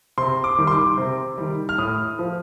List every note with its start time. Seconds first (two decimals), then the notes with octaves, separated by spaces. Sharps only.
0.18 C3 C6
0.44 D6
0.58 D#3 G3
0.67 C6
0.71 D6
0.98 C3
1.38 D#3 G3
1.69 F6
1.78 A2 D#6
2.19 F3